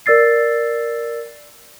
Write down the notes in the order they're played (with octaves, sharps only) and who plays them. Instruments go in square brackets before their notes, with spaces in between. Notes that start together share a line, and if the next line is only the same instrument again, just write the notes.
[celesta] A#4 D5 E6 A6 C7